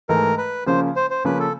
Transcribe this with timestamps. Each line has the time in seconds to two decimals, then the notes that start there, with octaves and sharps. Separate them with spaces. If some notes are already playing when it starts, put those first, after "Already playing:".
0.09 G#2 E3 A3 A#4
0.38 B4
0.66 C#3 F3 A#3 C#4 C5
0.96 C5
1.10 C5
1.25 C#3 F3 A#3 C#4 B4
1.40 A4